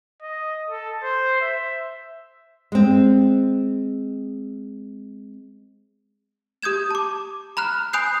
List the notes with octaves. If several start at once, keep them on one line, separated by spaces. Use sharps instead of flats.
D#5
A4
C5
E5
G#3 C4
G4 D#6 G6 G#6 E7
A5 D6
A#5 B5 F6 F#6
G#5 B5 D#6 F#6 G6 C7